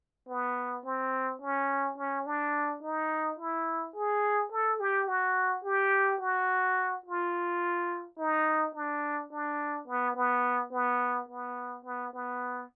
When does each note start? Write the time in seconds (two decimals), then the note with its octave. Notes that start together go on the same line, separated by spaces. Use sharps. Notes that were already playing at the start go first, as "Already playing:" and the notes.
0.29 B3
0.85 C4
1.42 C#4
1.98 C#4
2.26 D4
2.83 D#4
3.39 E4
3.95 G#4
4.52 A4
4.80 G4
5.08 F#4
5.64 G4
6.21 F#4
7.06 F4
8.19 D#4
8.75 D4
9.32 D4
9.88 B3
10.16 B3
10.72 B3
11.29 B3
11.85 B3
12.13 B3